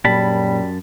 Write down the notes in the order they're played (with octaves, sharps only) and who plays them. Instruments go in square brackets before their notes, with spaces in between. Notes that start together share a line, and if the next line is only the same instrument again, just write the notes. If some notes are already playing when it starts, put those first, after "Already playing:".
[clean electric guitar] F#2 A5 B5 [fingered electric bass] A#2 F#3 [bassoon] G3